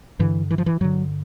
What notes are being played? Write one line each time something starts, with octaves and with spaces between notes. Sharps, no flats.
G2 D3 E3
E3
F3
E3
G2 D3 F#3